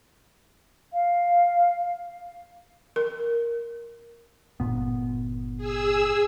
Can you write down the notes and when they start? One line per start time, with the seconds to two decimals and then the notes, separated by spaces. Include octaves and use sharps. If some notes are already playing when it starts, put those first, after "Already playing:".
0.93 F5
2.96 A#4
4.60 G1 A#2 B3
5.57 G#4 E6